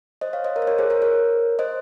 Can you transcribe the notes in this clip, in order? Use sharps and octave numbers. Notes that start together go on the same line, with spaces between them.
C5 D#5
C#5 F5
C5 D#5
A#4 C#5
C5
A#4 C#5
G#4 C5
A#4 C#5
A#4 C#5
C5 D#5